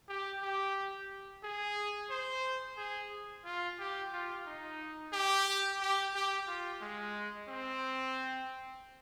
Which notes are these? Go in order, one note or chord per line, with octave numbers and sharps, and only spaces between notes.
G4
G4
G#4
C5
G#4
F4
G4
F4
D#4
G4
G4
G4
F4
G#3
C4